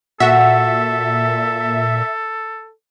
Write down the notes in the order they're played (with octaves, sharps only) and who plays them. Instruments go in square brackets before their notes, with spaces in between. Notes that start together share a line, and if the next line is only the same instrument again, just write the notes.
[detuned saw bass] A#2 [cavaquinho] F#4 F#5 [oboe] A4 [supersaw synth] E5